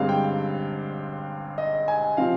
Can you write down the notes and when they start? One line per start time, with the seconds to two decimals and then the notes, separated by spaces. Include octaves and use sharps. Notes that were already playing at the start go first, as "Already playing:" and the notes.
Already playing: G2 D3 G#3 C4 F5
0.09 G5
1.58 D#5
1.88 G#5
2.17 C3 F3 C4 F5